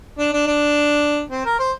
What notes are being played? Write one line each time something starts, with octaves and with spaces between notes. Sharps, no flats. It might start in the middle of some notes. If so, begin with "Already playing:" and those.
D4
D4
D4
C4
A#4
C5